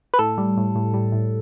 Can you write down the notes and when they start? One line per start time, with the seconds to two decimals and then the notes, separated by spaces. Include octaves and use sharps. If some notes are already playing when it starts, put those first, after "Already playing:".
0.14 B4
0.19 A2 A4
0.38 G3
0.57 A2
0.75 A2
0.94 G3
1.12 A2